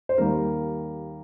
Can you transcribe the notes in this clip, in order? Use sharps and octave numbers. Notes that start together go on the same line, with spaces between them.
C5
D#2 D#3 G3 A#3 A#4